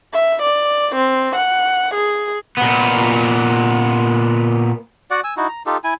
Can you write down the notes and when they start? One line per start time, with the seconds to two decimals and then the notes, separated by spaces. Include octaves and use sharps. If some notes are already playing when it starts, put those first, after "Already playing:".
0.13 E5
0.42 D5
0.95 C4
1.36 F#5
1.94 G#4
2.58 A#2 B3
5.11 F#4 D5 F#5
5.24 G#5 E6
5.37 D#4 E4 F#4
5.48 A#5
5.66 D#4 F4 G4 A4
5.84 E4 G#5